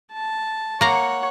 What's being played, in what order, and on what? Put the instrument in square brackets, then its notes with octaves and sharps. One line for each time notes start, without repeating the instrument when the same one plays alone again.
[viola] A5
[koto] A#3 A#5 [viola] C#5 F#5